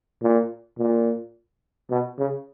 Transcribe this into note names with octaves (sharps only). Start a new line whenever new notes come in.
A#2
A#2
B2
C#3